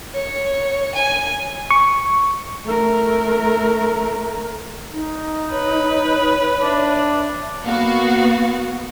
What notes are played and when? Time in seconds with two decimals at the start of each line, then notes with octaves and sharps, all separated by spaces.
0.14 C#5
0.95 G#5
1.70 C#6
2.65 A3 A#4
4.92 D#4
5.51 B4 C#5
6.61 D4 E5
7.65 A#3 B3 F#4 F5